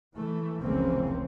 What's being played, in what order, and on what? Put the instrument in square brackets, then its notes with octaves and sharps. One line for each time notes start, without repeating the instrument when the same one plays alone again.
[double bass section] E3 A3
F1 C#2 E3 A#3 C4 C#4